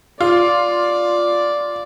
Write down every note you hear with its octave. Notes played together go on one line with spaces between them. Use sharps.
F4 D5